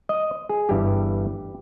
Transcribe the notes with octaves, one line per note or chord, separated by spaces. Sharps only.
D#5
G#4
G1 G2 E3 G3 G4